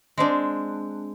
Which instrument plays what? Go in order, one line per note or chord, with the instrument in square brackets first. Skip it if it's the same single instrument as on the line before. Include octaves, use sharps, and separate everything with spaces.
[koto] G#3 C4 D4